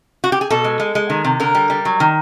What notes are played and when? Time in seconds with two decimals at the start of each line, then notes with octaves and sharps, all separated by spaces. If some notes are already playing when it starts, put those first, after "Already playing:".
0.24 F#4
0.32 G4
0.41 G#4
0.50 B2 A4
0.64 G#3
0.80 G#3
0.95 G#3
1.10 D#3
1.25 C3
1.40 D3 A#4
1.55 G3
1.70 G3
1.85 F#3
2.00 D#3